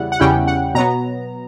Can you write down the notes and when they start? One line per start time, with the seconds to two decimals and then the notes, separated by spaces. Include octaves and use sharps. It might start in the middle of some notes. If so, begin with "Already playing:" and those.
Already playing: E2 C#3 G3 E4 F#5
0.12 F#5
0.20 E2 C#3 G3 C#4 E4 G5
0.47 F#5
0.74 B2 F#3 B3 A#5